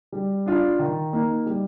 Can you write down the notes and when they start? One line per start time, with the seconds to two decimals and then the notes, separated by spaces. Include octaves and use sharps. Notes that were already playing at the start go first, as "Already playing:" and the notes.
0.12 G3
0.46 D4 F4
0.79 D#3
1.13 A#3 D#4
1.46 G3